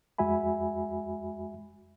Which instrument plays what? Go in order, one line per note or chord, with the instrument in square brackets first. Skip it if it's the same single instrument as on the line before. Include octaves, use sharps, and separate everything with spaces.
[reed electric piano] F2 G#3 F#4 E5 G#5 B5